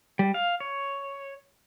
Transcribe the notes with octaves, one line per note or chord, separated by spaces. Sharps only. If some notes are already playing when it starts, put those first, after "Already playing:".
G3
F5
C#5